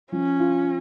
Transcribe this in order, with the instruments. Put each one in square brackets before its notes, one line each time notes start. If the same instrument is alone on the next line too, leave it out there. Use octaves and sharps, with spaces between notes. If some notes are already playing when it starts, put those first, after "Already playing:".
[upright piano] F3 [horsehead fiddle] C#4
[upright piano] F4